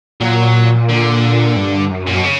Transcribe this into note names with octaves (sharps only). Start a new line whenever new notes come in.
A#2 F#3
D3
G2
F#2
A#2
B2
C#3